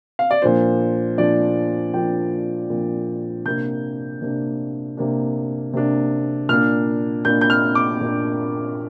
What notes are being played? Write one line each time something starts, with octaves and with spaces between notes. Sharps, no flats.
F5
D5
A#2 F3 D4 C5
A#2 F3 D4 D5
A#2 F3 D4 G5
A#2 F3 D4
C3 A#3 D4 G6
C3 A#3 D4
C3 A#3 D4
C3 A#3 D4
A#2 A#3 D4 F6
A#2 A#3 D4 G6
G6
F6
D6
A#2 A#3 D4